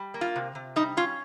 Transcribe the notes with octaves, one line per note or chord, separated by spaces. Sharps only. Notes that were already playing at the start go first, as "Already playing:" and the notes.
Already playing: G3
A#3
F4
C3
C3
G3 D#4
C#4 F4